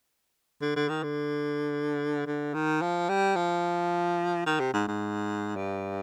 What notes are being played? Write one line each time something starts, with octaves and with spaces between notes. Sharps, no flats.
D3
D3
D#3
D3
D3
D#3
F3
G3
F3
D#3
C3
G#2
G#2
G2